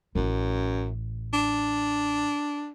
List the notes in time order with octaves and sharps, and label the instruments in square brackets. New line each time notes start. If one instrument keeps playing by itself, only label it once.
[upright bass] A1 [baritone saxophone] F#2
[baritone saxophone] D4